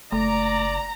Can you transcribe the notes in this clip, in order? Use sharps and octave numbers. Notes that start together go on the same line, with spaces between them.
F#1 A3 D5 A#5